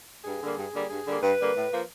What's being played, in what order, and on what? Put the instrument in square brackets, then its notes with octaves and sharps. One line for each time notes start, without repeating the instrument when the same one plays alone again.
[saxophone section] G2 G#4
D3 G3 A#3
G2
D3 G3 A#3
G2 G#4
D3 G3 A#3
G2 B4
D3 G3 A#3
A2
F3 A#3